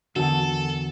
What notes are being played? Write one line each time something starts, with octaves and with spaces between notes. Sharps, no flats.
E2 D3 F#4 A4 A#4 A5